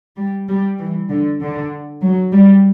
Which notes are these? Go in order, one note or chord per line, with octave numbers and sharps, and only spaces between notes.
G3
G3
E3
D3
D3
F#3
G3